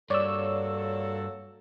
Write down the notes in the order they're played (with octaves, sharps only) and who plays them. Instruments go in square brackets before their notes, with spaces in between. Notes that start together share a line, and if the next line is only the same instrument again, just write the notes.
[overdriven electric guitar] G2 [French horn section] A#3 F#4 A4 [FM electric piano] C#5 E6 [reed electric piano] D5